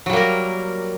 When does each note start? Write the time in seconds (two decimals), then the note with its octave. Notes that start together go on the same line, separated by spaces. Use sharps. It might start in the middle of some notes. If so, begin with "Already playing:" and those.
0.06 F#3
0.10 G3
0.13 A#3
0.17 A#4